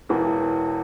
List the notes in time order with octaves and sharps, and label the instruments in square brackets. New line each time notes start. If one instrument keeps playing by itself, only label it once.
[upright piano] E1 E2 E3